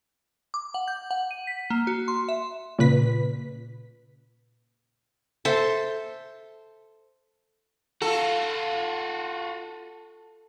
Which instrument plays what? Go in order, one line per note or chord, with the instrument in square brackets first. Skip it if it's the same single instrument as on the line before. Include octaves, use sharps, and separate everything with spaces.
[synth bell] D6
F#5
G6
F#5
D#7
B6
A#3
F#4
C6
E5
[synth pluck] A#2 C#3 B4 B6
[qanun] A4 C5 E5 A5
[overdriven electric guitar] F4 F#4 [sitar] A4